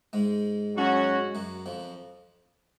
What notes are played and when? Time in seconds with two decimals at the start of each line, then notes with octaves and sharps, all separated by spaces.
0.13 G#2 G#3
0.74 F#3 C#4 F#4
1.35 F#2 F#3
1.66 F2 F3